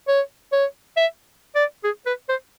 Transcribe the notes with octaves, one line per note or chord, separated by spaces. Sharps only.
C#5
C#5
E5
D5
G#4
B4
C5